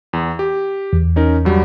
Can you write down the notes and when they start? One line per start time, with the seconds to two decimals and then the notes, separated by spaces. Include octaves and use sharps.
0.13 E2
0.39 G4
0.93 E2
1.16 C#4 D#4 A#4
1.45 G2 F#3 G3